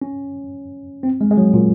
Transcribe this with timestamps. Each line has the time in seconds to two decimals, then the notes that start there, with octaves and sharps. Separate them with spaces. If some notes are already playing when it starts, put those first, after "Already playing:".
0.02 C#4
1.03 C4
1.21 G#3
1.31 G#3
1.37 F#3
1.54 A#2